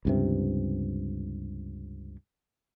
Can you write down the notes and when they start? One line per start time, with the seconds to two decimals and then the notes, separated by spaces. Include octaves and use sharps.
0.05 C#2 G2 C3